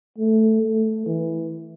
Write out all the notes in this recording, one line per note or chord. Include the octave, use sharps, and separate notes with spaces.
A3
A3
E3